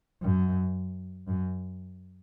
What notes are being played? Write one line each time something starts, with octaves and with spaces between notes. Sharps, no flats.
F#2
F#2